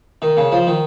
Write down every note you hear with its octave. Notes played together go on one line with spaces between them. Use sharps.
D#3
C#3
F3
D#3